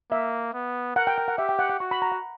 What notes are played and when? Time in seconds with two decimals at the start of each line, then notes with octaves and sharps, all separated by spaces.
0.11 A#3 E5
0.54 B3
0.96 A#4 F#5
1.07 G5
1.18 G5
1.28 F#5
1.38 G4 E5
1.49 G5
1.59 F#5
1.70 F#5
1.80 F#4 C#6
1.91 B5
2.02 A#5
2.12 F#5